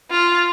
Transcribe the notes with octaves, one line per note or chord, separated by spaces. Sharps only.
F4